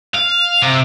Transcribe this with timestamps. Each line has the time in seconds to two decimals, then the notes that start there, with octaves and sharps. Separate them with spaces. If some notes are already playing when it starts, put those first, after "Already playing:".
0.15 F5
0.62 C3